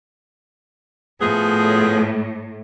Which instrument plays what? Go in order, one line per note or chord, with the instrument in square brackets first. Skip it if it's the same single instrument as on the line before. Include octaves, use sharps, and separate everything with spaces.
[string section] A2 [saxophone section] F3 B3 G#4